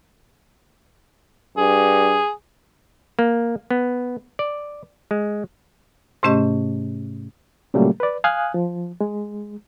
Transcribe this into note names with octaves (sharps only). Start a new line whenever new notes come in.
G2 G#4
A#3
B3
D5
G#3
G#2 C3 A3 C#4 G4 D#5
A#2 C#3 F#3 G3 A3 A#3
B4 D5
F5 G#5 D#6 F#6
F3
G#3